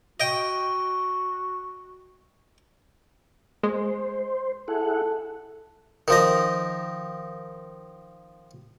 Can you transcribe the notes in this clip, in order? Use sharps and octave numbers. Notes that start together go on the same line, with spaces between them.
F#4 D#5 G5
G#3 C5
E4 G#4 A4 F#5
D#3 F3 D#5